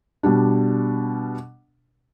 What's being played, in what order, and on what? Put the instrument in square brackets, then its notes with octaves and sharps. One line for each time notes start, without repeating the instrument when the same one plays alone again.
[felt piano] B2 G3 D4